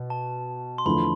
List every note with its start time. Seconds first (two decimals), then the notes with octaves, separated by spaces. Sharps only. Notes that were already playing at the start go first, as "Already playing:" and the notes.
Already playing: B2
0.10 A5
0.78 C6
0.86 E2 D3 F3 A3 B5